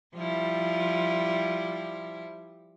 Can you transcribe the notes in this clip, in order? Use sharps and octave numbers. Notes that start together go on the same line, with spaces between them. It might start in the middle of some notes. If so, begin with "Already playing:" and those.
F3 G3 E4